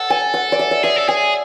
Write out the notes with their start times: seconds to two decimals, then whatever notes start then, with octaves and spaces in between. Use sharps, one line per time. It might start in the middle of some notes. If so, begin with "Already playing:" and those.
Already playing: A4 F#5
0.10 G#5
0.34 F#5
0.52 D5
0.59 E5
0.71 E5
0.83 G#4 E5
0.96 A4
1.08 G#4 G#5